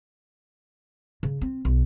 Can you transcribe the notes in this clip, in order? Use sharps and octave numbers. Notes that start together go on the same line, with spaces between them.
C#3
C4
B1